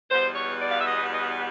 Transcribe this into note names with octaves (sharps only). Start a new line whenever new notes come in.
E2 B2 G3 B3 C5
C#5
D5
F5
E5
D#5
D#5